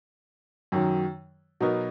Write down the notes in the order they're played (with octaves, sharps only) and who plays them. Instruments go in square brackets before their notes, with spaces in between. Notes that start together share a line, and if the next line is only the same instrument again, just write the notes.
[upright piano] F#2 D#3 F#3
B2 F#3 B3 D#4 A#4